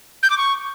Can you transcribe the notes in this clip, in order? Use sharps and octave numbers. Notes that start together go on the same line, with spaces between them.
G6
D6
C#6